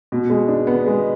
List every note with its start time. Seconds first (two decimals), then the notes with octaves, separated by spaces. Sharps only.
0.12 B2
0.30 G#3
0.48 D4
0.67 B3
0.87 G#3